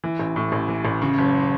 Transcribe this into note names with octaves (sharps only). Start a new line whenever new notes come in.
E3
A1
A2
A1
E3
A1
C#3
F#1